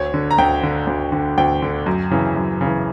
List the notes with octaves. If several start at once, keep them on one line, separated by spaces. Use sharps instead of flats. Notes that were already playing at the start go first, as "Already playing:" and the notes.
Already playing: D2 C#5
D3
A#5
D2 G5
D3
D2
D3
D2 G5
D3
F#2
C#3 E3
F#2
C#3 E3